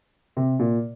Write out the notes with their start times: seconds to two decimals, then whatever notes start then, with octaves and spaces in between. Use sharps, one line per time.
0.37 C3
0.59 A#2